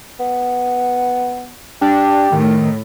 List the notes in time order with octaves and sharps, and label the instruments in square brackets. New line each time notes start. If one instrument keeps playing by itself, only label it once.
[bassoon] B3
[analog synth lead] D4 [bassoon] G4
[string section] A2 [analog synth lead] D#3